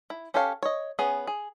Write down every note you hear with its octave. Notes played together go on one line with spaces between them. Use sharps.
E4
C#4 G4 A4 C#5 F5
C#5 D#5
B3 C#4 G#4
G#4